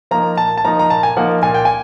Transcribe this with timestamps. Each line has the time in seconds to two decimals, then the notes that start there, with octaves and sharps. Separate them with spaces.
0.11 F3 A#3 D#4 A#5
0.37 A#2 A5
0.57 A5
0.65 F3 A#3 D#4 A#5
0.79 A#5
0.90 A#2 A5
1.03 G#5
1.17 F3 A#3 D#4 F#5
1.42 A#2 G#5
1.54 G5
1.65 G#5